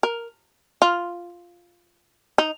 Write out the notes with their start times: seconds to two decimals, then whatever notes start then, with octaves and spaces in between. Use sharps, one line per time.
0.03 A#4
0.82 F4
2.38 D#4